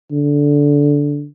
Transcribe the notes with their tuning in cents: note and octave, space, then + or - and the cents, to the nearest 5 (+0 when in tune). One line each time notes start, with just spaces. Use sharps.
D3 -15